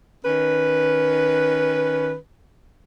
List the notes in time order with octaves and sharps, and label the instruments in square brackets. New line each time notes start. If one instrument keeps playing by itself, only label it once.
[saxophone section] D#3 C#4 B4